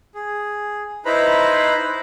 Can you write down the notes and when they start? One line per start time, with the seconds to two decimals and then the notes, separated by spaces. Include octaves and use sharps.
0.15 G#4
1.06 D#4 E4 B4 C5 A#5 B5